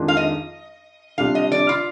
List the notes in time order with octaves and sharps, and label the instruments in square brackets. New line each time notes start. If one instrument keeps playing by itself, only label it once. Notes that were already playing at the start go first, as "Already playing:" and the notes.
Already playing: [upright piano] F2 D#3 G#3 D4 F4
[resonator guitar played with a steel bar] F5
D#5
[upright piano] C3 G3 D4 F4 [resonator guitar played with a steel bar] F5
[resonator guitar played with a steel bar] D#5
D5
F4